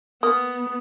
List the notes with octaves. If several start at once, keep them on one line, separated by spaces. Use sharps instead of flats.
A#3 B3 D#6